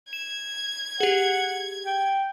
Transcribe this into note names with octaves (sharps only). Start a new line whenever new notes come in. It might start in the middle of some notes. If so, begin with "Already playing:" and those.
G#6 E7
G4 G#4 F#5
G5